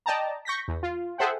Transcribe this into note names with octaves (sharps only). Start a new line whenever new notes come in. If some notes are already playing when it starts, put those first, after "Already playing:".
D5 D#5 G5 A5 A#5
C#6 G6 A#6 B6
E2
F4
G#4 A4 C5 E5 F#5 G5